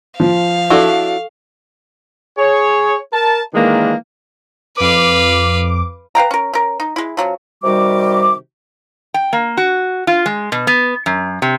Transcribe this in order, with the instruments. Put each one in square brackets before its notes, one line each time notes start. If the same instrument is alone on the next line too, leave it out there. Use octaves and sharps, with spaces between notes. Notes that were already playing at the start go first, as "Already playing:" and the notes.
[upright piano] F3 [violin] F5
[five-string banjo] D4 E4 F#4 [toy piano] A4 C#6
[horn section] G#4 C#5
A#4 A5
D#3 E3 G#3 A#3 D4
[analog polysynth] F2 D6 [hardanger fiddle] B4 F5
[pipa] B4 F5 G5 A#5
C#4 A#4
C#4 A#4
D#4
G#3 E4
F3 F#3 C#4
[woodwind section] C3 D#3 G3 F#4 D6
[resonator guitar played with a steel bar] G5
A#3
F#4
F4
G#3
B2
B3
F#2
C3